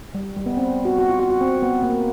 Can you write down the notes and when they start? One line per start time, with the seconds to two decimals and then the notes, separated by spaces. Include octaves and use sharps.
0.15 G3
0.36 G3
0.46 B3
0.57 C4
0.85 F#4
0.99 F#4
1.09 F4
1.20 F#4
1.30 F#4
1.41 C4
1.62 B3
1.83 A#3